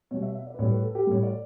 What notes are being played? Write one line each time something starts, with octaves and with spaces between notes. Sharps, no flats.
B2 G3 C#5
E5
E5
D5
B4
A2 G3 C#5
B4
A4
G4
A2 G3 C#5
D5